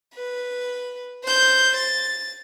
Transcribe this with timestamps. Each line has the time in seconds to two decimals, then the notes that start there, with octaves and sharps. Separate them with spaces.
0.15 B4
1.24 C5 G6
1.77 A6